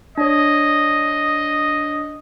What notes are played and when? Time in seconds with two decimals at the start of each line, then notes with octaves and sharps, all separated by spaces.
0.17 D4 C#5 D#5